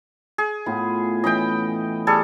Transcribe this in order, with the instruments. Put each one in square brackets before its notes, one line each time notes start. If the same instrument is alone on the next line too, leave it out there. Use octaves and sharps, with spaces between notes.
[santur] G#4
[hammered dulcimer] A2 B3 F4
[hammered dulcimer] E3 C#4 B5 [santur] D#5 G5
[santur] G3 G#4 A4